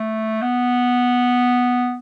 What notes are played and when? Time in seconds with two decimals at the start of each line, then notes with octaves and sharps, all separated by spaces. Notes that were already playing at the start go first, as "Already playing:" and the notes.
Already playing: A3
0.42 B3